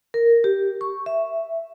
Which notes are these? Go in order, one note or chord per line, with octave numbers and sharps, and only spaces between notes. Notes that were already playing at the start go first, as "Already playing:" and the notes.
A#4
G4
C#6
E5